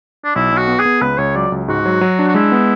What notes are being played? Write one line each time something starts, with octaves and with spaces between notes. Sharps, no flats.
D4
B1 E4
B1 F#4
B3
G#4
B3
C#2 B4
C#2 C#5
F#3 D5
C#2
G#2 F#4
F#3
F#3
D4
F#4
G#3 E4
B3